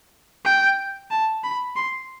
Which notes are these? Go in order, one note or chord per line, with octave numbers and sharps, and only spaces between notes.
G5
A5
B5
C6